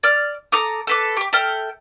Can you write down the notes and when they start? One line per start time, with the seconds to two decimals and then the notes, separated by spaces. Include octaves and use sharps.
0.03 D5 F6
0.52 A4 A#5 D6 D#6
0.87 A4 B4 D6
1.17 G4 D6
1.33 A4 E5 G5 F6